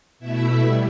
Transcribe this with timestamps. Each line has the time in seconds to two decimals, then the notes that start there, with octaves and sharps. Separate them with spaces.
0.19 B2 A3 E4 E5
0.59 G3